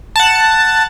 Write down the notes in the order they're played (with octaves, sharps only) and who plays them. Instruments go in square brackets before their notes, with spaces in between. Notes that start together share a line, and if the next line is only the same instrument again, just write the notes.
[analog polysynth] F#5 A5